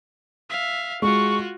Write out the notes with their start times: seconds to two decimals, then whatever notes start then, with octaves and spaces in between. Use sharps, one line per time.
0.50 E5 F5
1.02 G#3 F4 F#4 C#6